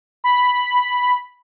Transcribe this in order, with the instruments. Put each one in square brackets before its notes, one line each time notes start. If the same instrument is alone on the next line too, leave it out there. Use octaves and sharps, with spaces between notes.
[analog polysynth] B5